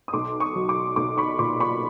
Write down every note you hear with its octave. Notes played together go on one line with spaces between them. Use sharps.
D#6
B1 C6 D6
C#6 D#6
F#3
C6 D6
B1 C6 D6
B5 C#6
A#2 C6 D6
B5 C#6